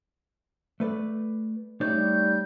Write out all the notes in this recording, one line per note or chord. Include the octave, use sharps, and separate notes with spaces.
A3 B4 D5
G3 A3 D#4 C#5 D5 G6